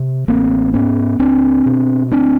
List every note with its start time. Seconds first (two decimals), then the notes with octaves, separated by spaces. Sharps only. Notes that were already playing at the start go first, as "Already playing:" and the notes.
Already playing: C3
0.28 A1 A#3 C4
0.74 G#2 B3 C#4
1.19 C#2 C4 D4
1.66 B2
2.11 D2 C4 D4